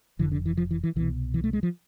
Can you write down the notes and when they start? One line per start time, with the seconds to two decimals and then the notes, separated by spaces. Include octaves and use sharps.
0.19 F1 F2 D3 E3
0.32 D3
0.46 E3
0.57 F3
0.71 E3
0.84 E3
0.96 C2 B2 E3
1.34 E3
1.44 A3
1.53 G#3
1.63 F3